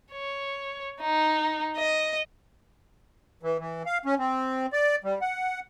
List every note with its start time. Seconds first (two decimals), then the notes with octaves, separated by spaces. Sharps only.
0.12 C#5
1.01 D#4
1.77 D#5
3.43 E3
3.59 E3
3.86 F5
4.05 C#4
4.19 C4
4.73 D5
5.04 G3
5.22 F#5